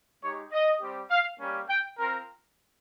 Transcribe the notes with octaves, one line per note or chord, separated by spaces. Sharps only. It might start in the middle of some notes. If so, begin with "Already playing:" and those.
G#3 D#4 G4 C#5
D#5
G3 C4 G4
F5
G3 A#3 C#4 G4
G5
C4 F4 A#4